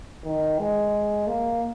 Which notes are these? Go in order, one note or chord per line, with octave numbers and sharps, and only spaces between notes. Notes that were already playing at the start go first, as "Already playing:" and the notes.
D#3
G#3
A#3